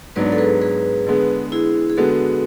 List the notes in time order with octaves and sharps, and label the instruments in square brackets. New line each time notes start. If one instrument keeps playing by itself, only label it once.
[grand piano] G#2 F#3 B3 D4 [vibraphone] B4 D5
[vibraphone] A4
G#4 B4
G#4 B4
[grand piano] D3 G#3 B3
[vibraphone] E4 G#4
G#4
[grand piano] D3 G#3 B3 [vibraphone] F#4 A4